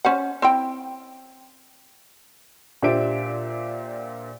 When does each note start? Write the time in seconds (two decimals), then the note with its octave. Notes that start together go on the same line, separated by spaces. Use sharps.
0.05 C#4 C5 F#5
0.42 C4 E4 G5
2.83 A#2 D4 G4 C5 E5 D7